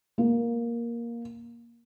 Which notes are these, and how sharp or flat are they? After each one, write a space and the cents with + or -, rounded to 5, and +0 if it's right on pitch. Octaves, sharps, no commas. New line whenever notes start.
A#3 +10